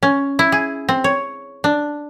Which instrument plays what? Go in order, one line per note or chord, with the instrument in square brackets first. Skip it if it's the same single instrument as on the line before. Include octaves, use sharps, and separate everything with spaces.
[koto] C#4
E4
G#4
C4
C#5
D4